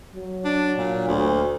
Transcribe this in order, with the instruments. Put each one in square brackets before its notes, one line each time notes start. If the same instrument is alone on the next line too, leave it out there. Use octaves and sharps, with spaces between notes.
[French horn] F#3
[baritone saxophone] D4
A#2
D2